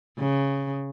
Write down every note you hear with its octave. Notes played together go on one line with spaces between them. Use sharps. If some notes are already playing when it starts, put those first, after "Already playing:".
C#3